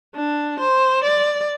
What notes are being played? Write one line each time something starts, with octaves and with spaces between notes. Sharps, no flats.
D4
C5
D5